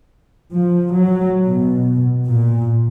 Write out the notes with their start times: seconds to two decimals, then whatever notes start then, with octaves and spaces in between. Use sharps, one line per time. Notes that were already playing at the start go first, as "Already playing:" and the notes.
0.53 F3
0.93 F#3
1.46 B2
2.27 A#2